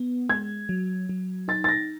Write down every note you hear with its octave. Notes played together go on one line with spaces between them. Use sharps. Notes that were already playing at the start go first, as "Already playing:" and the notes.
Already playing: B3
G#3 G#6
F#3
F#3
D#4 A6
A6
A#6